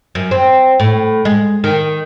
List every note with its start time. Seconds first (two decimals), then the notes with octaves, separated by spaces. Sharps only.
0.15 F#2
0.31 C4
0.80 A2
1.25 G#3
1.64 D#3